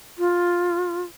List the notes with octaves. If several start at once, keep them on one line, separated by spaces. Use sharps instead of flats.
F4